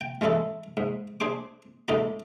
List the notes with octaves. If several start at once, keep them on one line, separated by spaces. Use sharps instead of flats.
G5
E3 G#3 C#4 E4 A4
G#2
D4 G#4 C5 D6
C#2 A2 A3 D#4 D5 B5